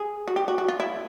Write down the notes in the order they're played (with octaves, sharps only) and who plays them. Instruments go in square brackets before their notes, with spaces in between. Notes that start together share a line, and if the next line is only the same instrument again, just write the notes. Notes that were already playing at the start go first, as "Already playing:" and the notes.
Already playing: [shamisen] G#4
F#4
G4
F#4
F#4
F4
E4